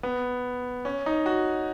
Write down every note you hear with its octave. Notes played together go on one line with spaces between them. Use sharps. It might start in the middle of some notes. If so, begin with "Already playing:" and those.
B3
C#4
D#4
F#4